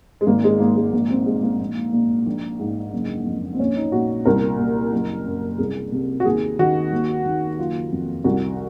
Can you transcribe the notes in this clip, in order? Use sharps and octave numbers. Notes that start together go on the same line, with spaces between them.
G#3
G#1 A#3
G#3
G#2 A#3
G#3
A#1 A#3
C4
A#2 G#3
A#3
A#1
A#2
A#1
G#2
F#1
F2
C4
A#1 C#4
D#4
A#2 F#4
C2 A#4
A#2
F#1
F#2
C2 G#4
C3
F#4
D#2 G#4
D#3 F#4
D#2
D#3
F#1 F4
F2
C2 F#4